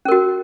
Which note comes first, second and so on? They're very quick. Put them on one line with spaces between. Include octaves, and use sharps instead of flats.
C#4 A#4 F#4